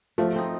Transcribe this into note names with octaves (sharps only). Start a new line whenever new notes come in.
F3 A3
C4 D#4